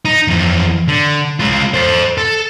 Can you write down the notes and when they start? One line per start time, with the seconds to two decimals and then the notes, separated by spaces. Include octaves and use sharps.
0.05 D#4
0.28 F2 E3
0.88 D3
1.40 G#3 F4
1.74 A4 C5
2.18 A4